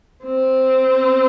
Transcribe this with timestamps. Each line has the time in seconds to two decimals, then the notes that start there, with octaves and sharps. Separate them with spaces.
0.24 C4